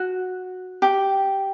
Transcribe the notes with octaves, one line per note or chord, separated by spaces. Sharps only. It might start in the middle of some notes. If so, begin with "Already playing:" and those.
Already playing: F#4
G4